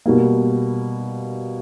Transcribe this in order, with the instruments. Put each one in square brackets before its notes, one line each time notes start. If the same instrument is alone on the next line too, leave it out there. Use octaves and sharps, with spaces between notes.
[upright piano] B2 G3 A#3